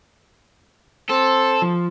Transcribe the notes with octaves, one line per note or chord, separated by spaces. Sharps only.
C4 A4
F3